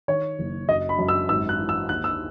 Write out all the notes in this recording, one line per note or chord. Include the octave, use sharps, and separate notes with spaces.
D#3 C#5
F#1
F#2 D#5
B5
F#2
E6
G#1 E6
F#6
E3
E6
D#2 F#6
E6